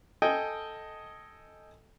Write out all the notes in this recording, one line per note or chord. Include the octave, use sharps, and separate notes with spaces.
A4 D#5 G5 G#5